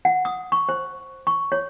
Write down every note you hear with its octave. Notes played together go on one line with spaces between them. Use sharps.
F#5
D#6
C#6
C5
C#6
C#5